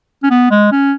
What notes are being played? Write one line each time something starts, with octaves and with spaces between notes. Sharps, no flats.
C#4
B3
G#3
C#4